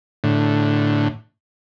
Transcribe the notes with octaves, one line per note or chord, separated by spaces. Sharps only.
A2 D3